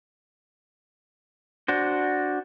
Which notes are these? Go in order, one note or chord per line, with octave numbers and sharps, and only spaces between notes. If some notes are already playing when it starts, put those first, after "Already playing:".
D4 F#4 C5